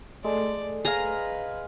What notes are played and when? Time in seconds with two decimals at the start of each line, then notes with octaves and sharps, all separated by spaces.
0.24 G#3 A3 A4 D5
0.85 G#4 B4 F5 G#5 A#5